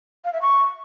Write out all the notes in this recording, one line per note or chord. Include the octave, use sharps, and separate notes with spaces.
F5
E5
C#6